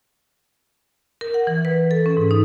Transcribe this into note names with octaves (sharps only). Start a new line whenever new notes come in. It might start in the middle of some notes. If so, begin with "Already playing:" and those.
A#4
F#5
E3
B4
A4
C#4
G#2
D#4